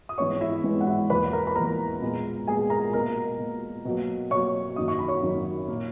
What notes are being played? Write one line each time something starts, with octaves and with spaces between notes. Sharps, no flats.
D#6
G#2 E3 G#3 B3 C#5 C#6
E4 E5
G#2 E3 G#3 B3
F#5
E4 E5
E2 B2 A#3 B4 B5
A#4 A#5
B5
E2 B2 A#3 A#4 A#5
A#2 G#3 B3
A#2 G#3 B3 G#4 G#5
A#4 A#5
B2 A#3 A#4 A#5
B2 A#3
B2 F#3 A#3
B2 F#3 A#3 C#5 C#6
F#2 D#3 F#3 A#3 D#6
C#6
B5
C#5 C#6
F#2 D#3 F#3 A#3
A#2 A#3